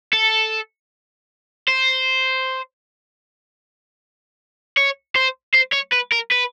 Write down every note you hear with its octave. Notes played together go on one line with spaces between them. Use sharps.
A4
C5
C#5
C5
C5
C#5
B4
A#4
B4